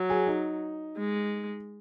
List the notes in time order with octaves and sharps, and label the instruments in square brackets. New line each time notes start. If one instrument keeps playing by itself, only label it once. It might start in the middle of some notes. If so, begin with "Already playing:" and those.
Already playing: [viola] F#3
[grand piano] G#4
D#4
[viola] G#3